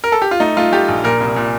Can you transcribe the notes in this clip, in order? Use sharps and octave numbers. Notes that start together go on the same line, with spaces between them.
A#4
A4
G4
F4
A3 D#4
A3 F4
A3 G4
A#1
A#2 A#4
C2
A#2